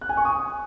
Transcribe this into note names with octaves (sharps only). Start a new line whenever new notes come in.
F#6
G#5
C#6
D#6